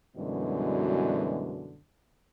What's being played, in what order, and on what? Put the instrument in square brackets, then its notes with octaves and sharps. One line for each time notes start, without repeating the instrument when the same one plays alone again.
[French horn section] F#2 B2 D3 E3 G3 G#3